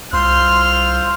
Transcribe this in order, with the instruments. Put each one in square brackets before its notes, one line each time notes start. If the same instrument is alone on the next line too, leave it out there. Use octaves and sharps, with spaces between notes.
[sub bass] C2 [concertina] F4 C5 E6 [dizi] C6 [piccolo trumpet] F6